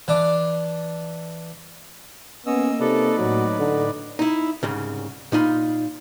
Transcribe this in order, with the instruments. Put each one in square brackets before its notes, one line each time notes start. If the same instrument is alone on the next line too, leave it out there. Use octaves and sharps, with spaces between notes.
[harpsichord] E3 D4 D6
[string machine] A#3 [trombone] B3 [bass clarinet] C#4 [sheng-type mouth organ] D#5 E6
[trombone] C3 [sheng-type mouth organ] D#4 B4 D5 [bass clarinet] A4
[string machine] A2 [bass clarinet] F#3 [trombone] F#4
[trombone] D3
[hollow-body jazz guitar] D#4 E4
C2 G#2 C#3
A#2 D#4 F4 B5